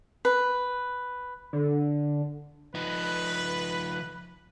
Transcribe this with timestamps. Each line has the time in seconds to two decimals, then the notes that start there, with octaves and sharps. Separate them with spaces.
0.25 B4
1.53 D3
2.75 F3 D#4 B4